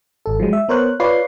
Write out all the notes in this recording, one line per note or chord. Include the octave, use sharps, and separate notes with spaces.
G#1 A4
F3 F#3 G#3
E5
B3 A#4 C5 C#5 F#6
F4 B4 C#5 D5 C7